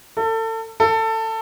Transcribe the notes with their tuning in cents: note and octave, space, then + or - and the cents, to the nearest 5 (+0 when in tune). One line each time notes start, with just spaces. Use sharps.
A4 +30
A4 +20